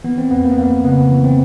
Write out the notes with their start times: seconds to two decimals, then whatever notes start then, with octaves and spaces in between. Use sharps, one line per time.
0.04 E3 B3
0.18 C4
0.31 F2 B3
0.44 A#3
0.52 B3
0.58 F2 A#3
0.84 C#3 B3
1.11 E3
1.24 C4